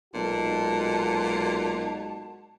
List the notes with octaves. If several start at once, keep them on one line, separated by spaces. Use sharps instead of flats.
B1 A#2 G#3 D#4 F#4 A5